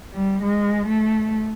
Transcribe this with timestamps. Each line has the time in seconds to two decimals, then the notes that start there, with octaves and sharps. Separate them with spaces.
0.13 G3
0.43 G#3
0.88 A3